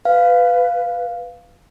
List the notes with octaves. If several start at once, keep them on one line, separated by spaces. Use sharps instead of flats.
B4 F5